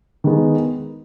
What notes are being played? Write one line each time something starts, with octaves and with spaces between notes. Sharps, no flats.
D#3 G#3 B3